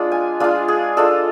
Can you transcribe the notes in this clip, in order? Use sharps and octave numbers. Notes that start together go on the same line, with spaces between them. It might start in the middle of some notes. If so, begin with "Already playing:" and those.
Already playing: G#3 D4 F4
G#5
G#3 D4 F4 F5
G#4
G#3 D4 F4 A4